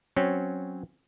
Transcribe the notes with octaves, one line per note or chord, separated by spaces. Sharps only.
F#3 C4 C#4